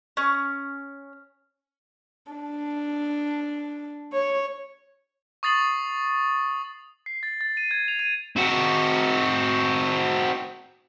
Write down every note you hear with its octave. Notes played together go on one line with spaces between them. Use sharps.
C#4
D4
C#5
C#6 D#6 A6 C7 F#7
C7
A6
A6
D#7
G#6
F7
D#7
C4 F#4